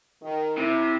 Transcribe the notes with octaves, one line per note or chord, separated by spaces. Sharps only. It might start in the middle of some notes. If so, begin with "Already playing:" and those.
D#3
C3 E4